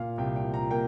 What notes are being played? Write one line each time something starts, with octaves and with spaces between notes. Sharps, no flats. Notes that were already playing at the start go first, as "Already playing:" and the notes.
Already playing: A#2 A#3 F5
C2 G5
G5
F3
A#5
A#3 G5